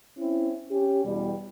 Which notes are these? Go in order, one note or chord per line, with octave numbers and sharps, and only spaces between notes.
C4 C#4 E4
C#4 G4
E2 B2 G3